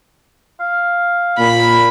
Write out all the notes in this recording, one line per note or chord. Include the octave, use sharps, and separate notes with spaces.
F5
A#2 B5